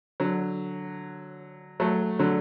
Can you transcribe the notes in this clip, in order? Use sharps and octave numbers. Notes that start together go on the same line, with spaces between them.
D3 F#3
F#3 A3
D3 F#3